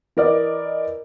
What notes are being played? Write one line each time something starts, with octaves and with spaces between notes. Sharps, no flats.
E3 A#4 D5 D#5